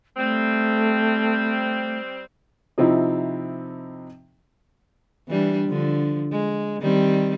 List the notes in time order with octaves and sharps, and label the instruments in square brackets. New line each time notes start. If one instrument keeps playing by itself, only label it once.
[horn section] G3 C4 [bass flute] A3
[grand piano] C3 F3 C4 D#4 E4
[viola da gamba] E3 G3 D4
D3 F3
G#3
D#3 G3 C4